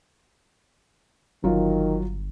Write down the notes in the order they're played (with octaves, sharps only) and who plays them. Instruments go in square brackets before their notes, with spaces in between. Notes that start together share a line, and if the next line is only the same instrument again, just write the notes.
[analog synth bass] G1 [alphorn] D#3 [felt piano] F#3 F4